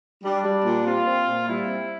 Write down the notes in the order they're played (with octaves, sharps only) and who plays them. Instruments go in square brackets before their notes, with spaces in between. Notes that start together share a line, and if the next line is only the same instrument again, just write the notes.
[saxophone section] G3 [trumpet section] D4
[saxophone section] G3
A#2
[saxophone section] C4 [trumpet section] F4
[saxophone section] C4
A#2
[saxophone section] G3 [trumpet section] E4
[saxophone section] C4